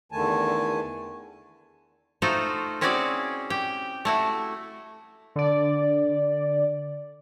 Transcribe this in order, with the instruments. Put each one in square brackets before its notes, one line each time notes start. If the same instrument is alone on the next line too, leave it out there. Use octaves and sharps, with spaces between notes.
[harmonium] E2 D3 D#3 A3 G#5 A5
[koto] A3 D#4 F4 F#4 A4 C5
C4 C#4 E4 F#4 G#4 D5
G4 G5
A3 E4 F#4
[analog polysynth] D3 D5